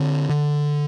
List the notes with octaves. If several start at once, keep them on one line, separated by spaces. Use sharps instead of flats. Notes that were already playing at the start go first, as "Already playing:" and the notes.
Already playing: D3 C4
D3